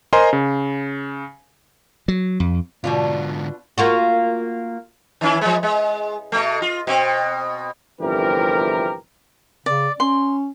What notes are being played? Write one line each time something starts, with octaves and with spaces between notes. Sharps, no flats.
A#4 C5 D#5 G#5 A#5 C6
C#3
F#3
F2
G#2 B2 D3 D4 F4
A#3 F4 F#4
D#3 C#4 E4
F3 G#3
G#3
B2 A3
F4
B2 C4
G1 F2 C3 E3 G4 A#4
C#3 D5
C#4 C6